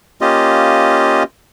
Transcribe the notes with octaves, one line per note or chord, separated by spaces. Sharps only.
A#3 C#4 F4 G4 D#5